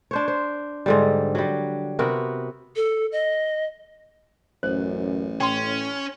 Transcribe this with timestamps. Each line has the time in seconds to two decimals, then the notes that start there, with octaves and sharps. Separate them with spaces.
0.11 D4 C5 C#5
0.28 C5
0.86 G#2 D3 G3
1.35 F#3 G3
1.99 C3 B3 F#4 A#4
2.76 A4
3.12 D#5
4.63 A1 F#2 C5
5.40 A2 C#4 G5 C6